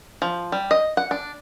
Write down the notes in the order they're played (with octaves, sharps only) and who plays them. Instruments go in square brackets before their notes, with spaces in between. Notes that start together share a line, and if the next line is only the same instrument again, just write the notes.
[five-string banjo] F3
G3
D#5
F#5
D4